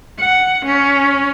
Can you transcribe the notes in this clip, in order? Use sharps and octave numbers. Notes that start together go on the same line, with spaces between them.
F#5
C#4